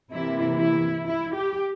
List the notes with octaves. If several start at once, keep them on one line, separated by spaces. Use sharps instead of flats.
C3 E3 A#3 E4
E4
E4
G4